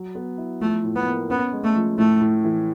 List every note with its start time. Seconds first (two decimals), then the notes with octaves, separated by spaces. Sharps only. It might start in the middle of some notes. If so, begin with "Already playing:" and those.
Already playing: F#3
0.15 B3
0.38 E4
0.61 F3 A3
0.84 A2
0.95 B3
1.07 A#3
1.29 B3 C#4
1.52 G#3
1.63 A3
1.76 F3
1.98 A2 A3
2.21 A2
2.44 E3